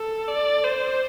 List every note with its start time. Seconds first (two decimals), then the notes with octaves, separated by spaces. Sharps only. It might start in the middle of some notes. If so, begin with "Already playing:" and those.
Already playing: A4
0.28 D5
0.64 C5